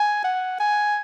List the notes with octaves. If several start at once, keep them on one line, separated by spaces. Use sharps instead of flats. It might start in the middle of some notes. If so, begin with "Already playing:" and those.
Already playing: G#5
F#5
G#5